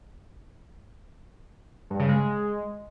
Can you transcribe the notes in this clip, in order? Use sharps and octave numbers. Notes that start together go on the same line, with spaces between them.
G2
C#3
G#3